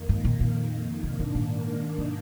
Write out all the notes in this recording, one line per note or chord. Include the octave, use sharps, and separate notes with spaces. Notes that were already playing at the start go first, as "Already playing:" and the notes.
Already playing: F2 D#3 A#3
G#2
A#2
A#2
G#2 C3 D#3 A#3 D4
C3
A#2
C3